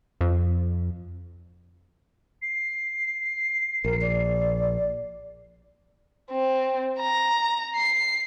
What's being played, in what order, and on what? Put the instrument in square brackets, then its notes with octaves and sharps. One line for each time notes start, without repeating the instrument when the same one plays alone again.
[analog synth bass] F2
[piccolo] C7
[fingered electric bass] A#1 [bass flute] A#4
[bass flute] D5
[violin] C4
A#5
C7